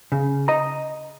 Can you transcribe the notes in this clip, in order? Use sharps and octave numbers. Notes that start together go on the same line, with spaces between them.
C#3
D#5 A#5